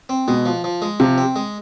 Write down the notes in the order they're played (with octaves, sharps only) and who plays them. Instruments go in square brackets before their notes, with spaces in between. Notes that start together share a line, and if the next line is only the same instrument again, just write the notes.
[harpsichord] C4
[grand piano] B2 [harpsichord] G#3
[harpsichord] F3
F3
G#3
[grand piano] C3 [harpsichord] F3
[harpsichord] C4
G#3